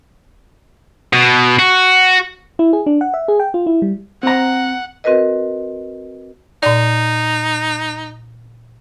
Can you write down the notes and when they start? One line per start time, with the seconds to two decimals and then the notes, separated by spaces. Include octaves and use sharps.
1.13 B2
1.59 F#4
2.59 E4
2.73 G#4
2.86 D4
3.01 F#5
3.14 E5
3.28 G#4
3.40 G5
3.54 F4
3.66 E4
3.82 G3
4.23 C4 F#5 A#5
5.04 C4 F#4 A#4 B4 D#5
6.63 A#2 D#4 D5